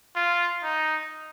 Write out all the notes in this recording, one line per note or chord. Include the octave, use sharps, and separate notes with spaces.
F4
D#4